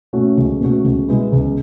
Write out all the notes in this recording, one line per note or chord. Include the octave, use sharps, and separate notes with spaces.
B2 A3 C#4 F#4
C#2
B2 A3 C#4 F#4
C#2
B2 G#3 B3 E4
C#2